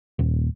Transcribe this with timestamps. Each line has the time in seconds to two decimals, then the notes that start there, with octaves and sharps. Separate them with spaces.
0.19 D#1